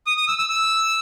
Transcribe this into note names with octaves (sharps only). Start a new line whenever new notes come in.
D#6
D#6
E6
E6
E6